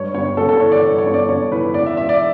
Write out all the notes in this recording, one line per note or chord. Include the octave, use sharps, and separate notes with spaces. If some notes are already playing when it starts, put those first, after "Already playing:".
Already playing: G2 C#5
G1 C#5
G1 A4
A4
E3 C#5
D5
G2
C#5
G1
D5
G1 C#5
E3 B4
E2 D5
E5
E1 E5
D5